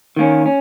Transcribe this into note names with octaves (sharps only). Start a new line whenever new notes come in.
D#3 A#3 C#4
C#4